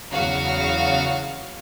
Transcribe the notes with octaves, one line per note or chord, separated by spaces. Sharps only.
E2 C#3 F#3 F#4 F5